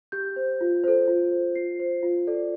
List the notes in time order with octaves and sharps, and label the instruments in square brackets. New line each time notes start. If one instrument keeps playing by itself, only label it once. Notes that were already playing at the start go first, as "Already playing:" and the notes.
[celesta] G4 G6
C5
F4
A4 C5
F4
C5
F4 C7
C5
F4
A4 D5